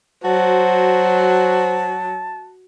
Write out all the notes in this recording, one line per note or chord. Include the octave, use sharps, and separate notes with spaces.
F#3 F#4 C5 A5